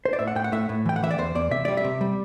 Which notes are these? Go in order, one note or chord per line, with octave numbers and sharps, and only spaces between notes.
C5
D5
A2 E5
F#5
A2 G5
F#5
A2 E5
A2
E3 G5
F#5
E3 E5
D5
E2 C5
E2 D5
C3 E5
G3 D5
E5
C3
G3